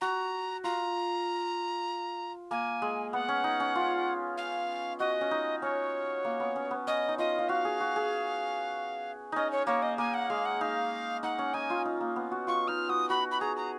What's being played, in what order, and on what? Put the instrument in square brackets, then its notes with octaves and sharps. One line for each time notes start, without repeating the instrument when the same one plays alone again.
[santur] F#4 [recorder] A#5
[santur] F4 [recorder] A#5
[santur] A#3 [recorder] G#5
[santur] G#3
[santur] B3 [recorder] F#5
[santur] C#4
D#4
C#4
F4
[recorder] F5
[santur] F#4 [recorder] D#5
[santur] C#4
D#4
[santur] C#4 [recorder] C#5
[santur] A#3
B3
C#4
B3
[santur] C#4 [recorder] D#5
[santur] D#4
[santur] F4 [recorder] D#5
[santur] F4
[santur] F#4 [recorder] F5
[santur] G#4
F#4
G#4
[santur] C#4 D#4 [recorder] D#5
[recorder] C#5
[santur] A#3 [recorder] C#5
[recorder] D#5
[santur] A#3 [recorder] G#5
[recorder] F#5
[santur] G#3 [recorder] F5
[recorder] F#5
[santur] D#4 [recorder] F5
[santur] D#4 [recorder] F#5
[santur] C#4
[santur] D#4 [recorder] G#5
[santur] F4
D#4
A#3
B3
F#4
[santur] F4 [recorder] C#6
[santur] D#4 [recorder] F6
[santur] F#4 [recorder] D#6
[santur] F#4 [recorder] B5
[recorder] B5
[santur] G#4 [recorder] A#5
[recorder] A#5